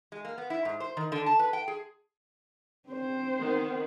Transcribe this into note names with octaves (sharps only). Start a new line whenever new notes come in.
G#3
A#3
B3
E4
G#2
C5
D#3
D3
A5
B4
G5
G#4
C4 C5
D#3 B3